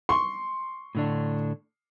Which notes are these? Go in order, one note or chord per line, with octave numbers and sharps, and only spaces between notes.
C6 C#6
A2 D3 D4